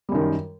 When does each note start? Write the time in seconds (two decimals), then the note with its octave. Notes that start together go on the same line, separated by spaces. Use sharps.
0.09 G3
0.12 F#2
0.15 D#3